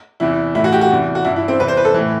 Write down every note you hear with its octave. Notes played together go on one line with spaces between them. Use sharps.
E2 C3 E3 E4
A2 E3 E4
F#4
G4
F#4
E2 C3 E3
F#4
G2 E3 E4
E4
C4
E2 C3 E3 B4
C5
B4
A4
A2 E3